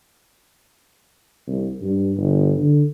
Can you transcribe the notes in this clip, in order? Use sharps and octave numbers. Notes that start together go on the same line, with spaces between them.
C2
G2
G1
D3